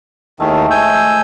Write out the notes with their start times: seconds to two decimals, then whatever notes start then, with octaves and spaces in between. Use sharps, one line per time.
0.40 D#2 D#3 G#3 A3 E4
0.71 F3 G#5 E6 G6